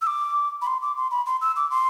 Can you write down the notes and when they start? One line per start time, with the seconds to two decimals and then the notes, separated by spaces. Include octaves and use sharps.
0.02 E6
0.07 D6
0.62 B5
0.67 C6
0.82 D6
0.97 C6
1.11 B5
1.26 C6
1.41 E6
1.56 D6
1.71 C6